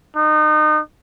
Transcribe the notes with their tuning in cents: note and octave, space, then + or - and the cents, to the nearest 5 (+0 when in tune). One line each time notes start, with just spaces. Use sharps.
D#4 -30